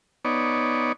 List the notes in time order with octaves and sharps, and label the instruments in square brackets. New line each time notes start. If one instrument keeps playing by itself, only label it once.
[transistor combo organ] B3 D#4 C#5 D5